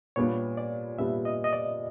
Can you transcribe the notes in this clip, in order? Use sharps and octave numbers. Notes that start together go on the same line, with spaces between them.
A#2 G3 B3 D4 G4 C#5
D5
A#2 G3 B3 D4 G4 E5
D#5
D#5
D5